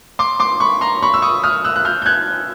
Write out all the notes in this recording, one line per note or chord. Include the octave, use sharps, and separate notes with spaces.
C6 D6
C6 D6
B5 C#6
A#5 C6
B5 C#6
E6
C#6 D#6
D#6 F6
E6 F#6
F#6
F6 G6
G6
F#6 G#6